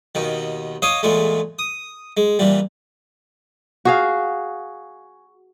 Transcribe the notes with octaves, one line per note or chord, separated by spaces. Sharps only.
D#2 B2 D#3
C#5 D#5 F5 D6 D#6
E2 A#2 G#3 A3
D#6
G#3
A#2 E3 G3
F#4 G#4 F5